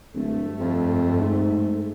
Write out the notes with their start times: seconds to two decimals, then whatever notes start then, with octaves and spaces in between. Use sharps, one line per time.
0.14 D1 G2 A3
0.60 F2
1.21 G#2